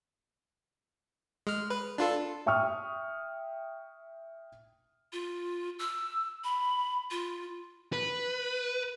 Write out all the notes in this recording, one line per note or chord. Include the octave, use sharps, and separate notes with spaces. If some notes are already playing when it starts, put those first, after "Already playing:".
G#3 F6
B4
D4 F4 A4
E5 G5 C#6 D#6 F6
F4
E6
B5
F4
B4